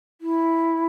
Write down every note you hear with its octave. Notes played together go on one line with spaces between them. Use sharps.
E4